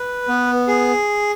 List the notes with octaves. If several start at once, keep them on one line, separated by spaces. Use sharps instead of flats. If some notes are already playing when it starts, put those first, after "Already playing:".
Already playing: B4
B3
G#4